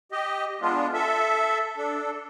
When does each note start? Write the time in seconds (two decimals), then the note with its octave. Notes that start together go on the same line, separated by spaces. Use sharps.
0.12 G4 D#5
0.61 G#3 B3 D4 F4
0.93 A4 E5
1.77 D4 A4